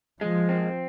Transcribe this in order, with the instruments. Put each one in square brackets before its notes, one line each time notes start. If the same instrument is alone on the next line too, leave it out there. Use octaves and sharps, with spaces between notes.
[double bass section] F3 [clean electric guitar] G#3
[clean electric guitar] C4